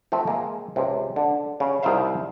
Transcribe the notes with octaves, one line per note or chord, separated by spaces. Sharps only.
F3 A3 C4 F4 E5
G#3 A#3
C#2 C3
D3
C#3
C2 D#4 F4 C5 E5 F5